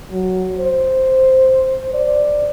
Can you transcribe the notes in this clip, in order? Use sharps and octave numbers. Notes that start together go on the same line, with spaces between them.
F#3
C5
D5